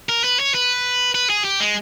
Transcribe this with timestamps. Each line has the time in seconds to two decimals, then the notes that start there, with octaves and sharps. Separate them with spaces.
0.09 A#4
0.24 B4
0.40 C#5
0.54 B4
1.15 B4
1.30 G#4
1.45 G4
1.60 G#3